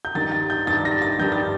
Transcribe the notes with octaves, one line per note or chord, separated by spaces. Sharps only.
G6
G2 D#3 G3 A6
A6
G6
G2 D#3 G3 A6
A#6
A6
G2 D#3 G3 G6
A6